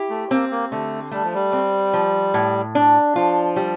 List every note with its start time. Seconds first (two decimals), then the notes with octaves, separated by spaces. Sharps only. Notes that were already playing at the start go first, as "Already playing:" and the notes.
Already playing: E4 G4
0.10 A3
0.31 A#3 C4
0.51 A#3
0.71 D3 A3
1.11 G3 A3
1.23 F3
1.34 G3
1.53 C4
1.94 F3
2.34 A2
2.75 D4
3.15 F3 F4
3.56 G3